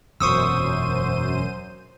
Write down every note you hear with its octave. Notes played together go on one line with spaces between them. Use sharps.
E1 F#2 A#2 C5 C#6 D#6 E6 D#7